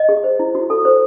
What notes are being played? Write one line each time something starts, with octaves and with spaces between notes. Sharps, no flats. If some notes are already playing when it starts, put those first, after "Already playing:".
Already playing: D#5
G#4
C5
E4
F#4
A4
C5